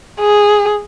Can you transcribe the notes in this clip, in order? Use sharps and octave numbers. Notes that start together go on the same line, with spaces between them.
G#4